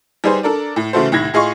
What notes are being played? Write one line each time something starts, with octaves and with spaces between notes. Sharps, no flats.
G3 D#4 G#4 B4 C5
D4 A4 A#4 D5
A2
C#3 E3 A3 F#4 A4 C5
C2 A2 D#3 G#6 A#6
A2 F4 G#4 D#5 C6 C#6